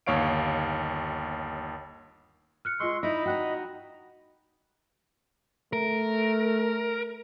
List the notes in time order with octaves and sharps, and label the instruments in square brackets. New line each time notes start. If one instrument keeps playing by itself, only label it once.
[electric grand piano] G1 D#2 C#5 F5 D7
[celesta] F6 F#6 C#7
[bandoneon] G#3 C6 C#6 [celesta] F4 E6
[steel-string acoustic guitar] D#4 E4 [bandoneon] D#5 B5
[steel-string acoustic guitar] D#4 F#4 [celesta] F#5 G5 F#6
[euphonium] A3 [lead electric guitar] A#4